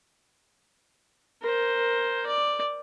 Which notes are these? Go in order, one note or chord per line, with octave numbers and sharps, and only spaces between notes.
A#4 C5
D5